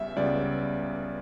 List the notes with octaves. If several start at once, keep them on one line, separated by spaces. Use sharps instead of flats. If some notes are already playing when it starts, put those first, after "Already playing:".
Already playing: C#2 C#3 G3 B3 E5
C#2 C#3 G3 B3 D5